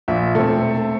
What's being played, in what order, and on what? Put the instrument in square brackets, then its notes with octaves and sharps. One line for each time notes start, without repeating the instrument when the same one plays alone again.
[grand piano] A#1 E5
[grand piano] E1 [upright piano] A3 C4